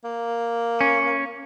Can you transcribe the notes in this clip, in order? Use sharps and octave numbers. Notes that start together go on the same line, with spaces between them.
A#3
C#4